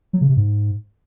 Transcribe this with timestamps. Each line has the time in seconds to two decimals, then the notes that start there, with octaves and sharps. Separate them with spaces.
0.13 F#3
0.21 C#3
0.29 C3
0.37 G#2